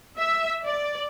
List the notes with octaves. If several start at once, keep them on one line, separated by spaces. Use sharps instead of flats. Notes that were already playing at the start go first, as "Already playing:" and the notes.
E5
D5